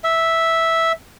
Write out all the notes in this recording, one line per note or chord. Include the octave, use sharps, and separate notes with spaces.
E5